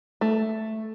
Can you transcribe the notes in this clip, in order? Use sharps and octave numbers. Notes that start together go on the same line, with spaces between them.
A3